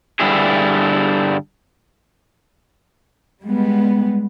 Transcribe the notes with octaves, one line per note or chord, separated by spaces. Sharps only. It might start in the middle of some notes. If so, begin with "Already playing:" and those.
G2 D3 G3 E4 G#4
G3 G#3 B3